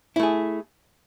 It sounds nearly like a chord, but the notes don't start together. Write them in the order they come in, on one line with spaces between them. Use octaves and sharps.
E4 A3 G#4